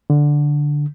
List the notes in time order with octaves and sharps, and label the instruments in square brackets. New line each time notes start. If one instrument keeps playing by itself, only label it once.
[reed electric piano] D3